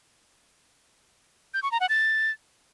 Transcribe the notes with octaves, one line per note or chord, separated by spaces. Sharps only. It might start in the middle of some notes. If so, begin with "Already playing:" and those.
G6
C#6
A#5
F#5
A6